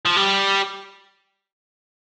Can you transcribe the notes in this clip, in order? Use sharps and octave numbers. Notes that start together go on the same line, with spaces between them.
F3
G3